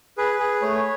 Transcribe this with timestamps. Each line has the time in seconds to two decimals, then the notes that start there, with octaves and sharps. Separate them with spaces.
0.18 G#4 B4
0.39 G#4
0.62 A3 C#5